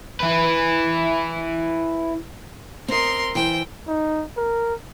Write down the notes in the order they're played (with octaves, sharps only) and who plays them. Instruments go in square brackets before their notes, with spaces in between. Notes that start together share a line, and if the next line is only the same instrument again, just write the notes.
[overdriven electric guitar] E4 B4
[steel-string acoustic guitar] C4 D#5 [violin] A#4 C6
[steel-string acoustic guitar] E3 C5 [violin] G5
[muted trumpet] D#4
A#4